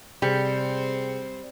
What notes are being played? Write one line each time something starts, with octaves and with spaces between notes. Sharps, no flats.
C3 G3 C4 G#4 C5 C#7